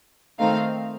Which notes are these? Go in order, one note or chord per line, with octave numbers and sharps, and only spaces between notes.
D#3 A3 C4 D#4 F5